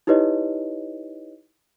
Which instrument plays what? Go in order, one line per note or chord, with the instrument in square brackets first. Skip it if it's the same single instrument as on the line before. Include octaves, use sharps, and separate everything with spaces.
[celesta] D#4 E4 G4 B4 C#5 D#5